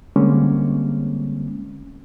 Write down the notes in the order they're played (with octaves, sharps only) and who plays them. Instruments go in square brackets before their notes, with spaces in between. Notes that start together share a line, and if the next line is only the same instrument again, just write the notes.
[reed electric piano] D3 G3 G#3 A#3 C4 C#4